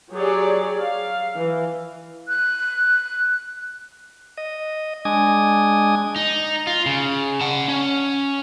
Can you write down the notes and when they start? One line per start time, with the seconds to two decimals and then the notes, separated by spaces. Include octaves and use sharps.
0.13 F#3 G4 G#4 C#5 D5
0.77 F5
1.35 E3
2.28 F#6
4.37 D#5
5.05 G#3 D4 G#5 D#6
6.16 D#4
6.67 F4
6.86 C#3
7.41 F#5 A5
7.68 C#4